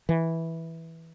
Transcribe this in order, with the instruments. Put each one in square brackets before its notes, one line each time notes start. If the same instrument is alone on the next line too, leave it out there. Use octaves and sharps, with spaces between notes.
[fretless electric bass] E3